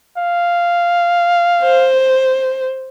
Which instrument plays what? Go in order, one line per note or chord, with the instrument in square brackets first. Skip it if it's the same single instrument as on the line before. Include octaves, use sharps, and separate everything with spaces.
[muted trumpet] F5
[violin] C5